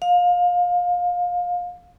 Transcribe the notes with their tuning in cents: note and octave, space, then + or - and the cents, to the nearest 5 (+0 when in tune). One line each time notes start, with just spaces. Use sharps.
F5 +25